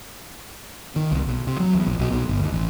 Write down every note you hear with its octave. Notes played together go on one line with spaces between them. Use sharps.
D#3
C2
B1
C3
F#3
E2
A#1
B1
B1
G1
D#2
A1